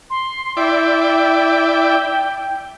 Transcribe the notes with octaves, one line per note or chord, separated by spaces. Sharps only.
C6
E4 D5 G5